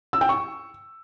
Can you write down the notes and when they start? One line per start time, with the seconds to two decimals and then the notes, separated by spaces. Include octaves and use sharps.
0.13 E6
0.21 G5
0.29 C#6